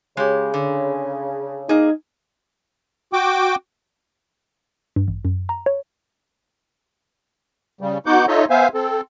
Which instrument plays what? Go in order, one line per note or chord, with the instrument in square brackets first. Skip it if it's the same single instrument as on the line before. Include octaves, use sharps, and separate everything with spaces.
[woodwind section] C#3 [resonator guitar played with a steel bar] G#3 G4
[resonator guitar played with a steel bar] D3
[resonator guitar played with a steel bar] A#3 G#4 [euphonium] D#4
[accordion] F#4 G5 D6
[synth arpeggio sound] G2
A1
F#2
A#5
C#5
[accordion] C#3 G3
B3 D#4 F#4 F#5 D6 G6
D#4 F4 A4 C#5 D#5 E5
B3 C5 E5 F5 G#5
C4 A4